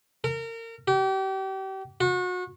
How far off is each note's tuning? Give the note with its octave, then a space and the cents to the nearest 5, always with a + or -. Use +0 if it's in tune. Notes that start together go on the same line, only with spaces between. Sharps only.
A#4 -30
G4 -35
F#4 -30